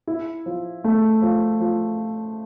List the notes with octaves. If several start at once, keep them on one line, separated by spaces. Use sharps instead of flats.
E4
F3
A3
F3
F3